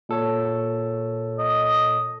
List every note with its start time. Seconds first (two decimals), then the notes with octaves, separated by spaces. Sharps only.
0.09 A#2 A4 C#5
1.38 D#5